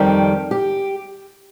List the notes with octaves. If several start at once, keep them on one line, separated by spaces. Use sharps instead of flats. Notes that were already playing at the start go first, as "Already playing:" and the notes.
Already playing: F2 D#3 G3 G4
G4